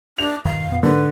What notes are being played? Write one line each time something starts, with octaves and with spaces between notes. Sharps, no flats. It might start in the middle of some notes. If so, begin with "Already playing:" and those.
D4 F7
E1 G2 D#3 F5
F2 A#2 B3
G#2 D3 B4